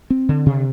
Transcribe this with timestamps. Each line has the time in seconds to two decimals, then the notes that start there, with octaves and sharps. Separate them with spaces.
0.10 C4
0.29 D3
0.46 C3